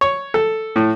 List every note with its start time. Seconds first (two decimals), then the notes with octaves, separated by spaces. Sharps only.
0.01 C#5
0.34 A4
0.76 A2